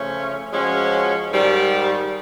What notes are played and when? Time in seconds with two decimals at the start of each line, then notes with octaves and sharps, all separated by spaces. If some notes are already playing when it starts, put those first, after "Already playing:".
Already playing: C#3 F3 A3 C#4
0.52 F3 G#3 C#4 F#4
1.31 G#2 D#3 G3